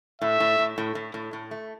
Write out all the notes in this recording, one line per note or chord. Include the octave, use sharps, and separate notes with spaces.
A2 E5
A2
A2
A2
A2
A2
A2
A3